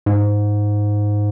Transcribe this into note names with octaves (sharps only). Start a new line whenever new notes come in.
G#2